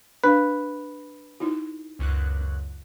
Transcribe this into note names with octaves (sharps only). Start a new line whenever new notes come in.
D4 B4 F5
D#4 E4 F#4
C#2 F#2 F#6